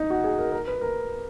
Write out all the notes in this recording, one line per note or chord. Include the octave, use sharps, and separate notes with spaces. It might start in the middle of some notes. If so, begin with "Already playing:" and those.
Already playing: D#4
F#4
G#4
A#4
A#4
B4
A#4